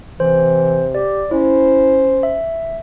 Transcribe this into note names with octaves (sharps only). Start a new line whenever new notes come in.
C3 E3 C5
G4 D5
C#4 E4 C5
E5